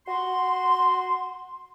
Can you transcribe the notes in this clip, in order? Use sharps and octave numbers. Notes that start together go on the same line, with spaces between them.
F#4 C6